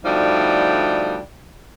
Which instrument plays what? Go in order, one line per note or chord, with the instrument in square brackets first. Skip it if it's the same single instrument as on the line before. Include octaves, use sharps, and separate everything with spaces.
[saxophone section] B2 D3 F3 G3 A3 D#4